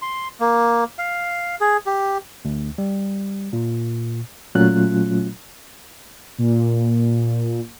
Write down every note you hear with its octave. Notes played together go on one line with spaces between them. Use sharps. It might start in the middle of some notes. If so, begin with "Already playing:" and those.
C6
A#3
F5
G#4
G4
D2
G3
A#2
A#2 F#3 A3 C#4 F4 F#6
A#2